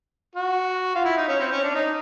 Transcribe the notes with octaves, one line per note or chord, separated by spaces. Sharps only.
F#4
F4
E4
D#4
C#4
C4
C#4
D4
D#4